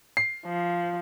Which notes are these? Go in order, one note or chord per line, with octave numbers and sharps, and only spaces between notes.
C7
F3